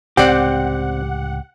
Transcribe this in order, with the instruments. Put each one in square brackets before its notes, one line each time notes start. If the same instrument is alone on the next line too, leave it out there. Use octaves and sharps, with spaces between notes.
[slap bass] C#2 A2 C3 [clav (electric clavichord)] C4 D5 [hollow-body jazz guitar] G4 [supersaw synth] F#5